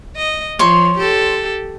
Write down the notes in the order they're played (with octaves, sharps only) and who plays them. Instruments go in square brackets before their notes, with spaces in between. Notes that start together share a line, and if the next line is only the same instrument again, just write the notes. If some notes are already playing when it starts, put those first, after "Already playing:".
[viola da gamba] D#5
[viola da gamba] F3 [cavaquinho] C#5 C6
[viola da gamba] G4 A4